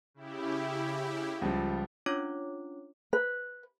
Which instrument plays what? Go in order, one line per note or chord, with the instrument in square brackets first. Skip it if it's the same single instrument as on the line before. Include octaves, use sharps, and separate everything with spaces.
[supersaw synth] C#3 E4 G4
[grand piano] C#2 F3 G3
[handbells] C#4 D4 F4 C#5 D6
[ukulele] B4